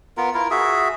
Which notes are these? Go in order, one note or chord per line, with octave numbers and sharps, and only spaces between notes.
B3 F4 A#4
E4 F4 A#4
F#4 G#4 E5